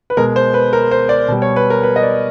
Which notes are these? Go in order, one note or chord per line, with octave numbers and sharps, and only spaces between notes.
B4
B2 G#3 A#4
C5
B4
A#4
C5
D5
B2 G3
C#5
B4
A#4
B4
D#5
D5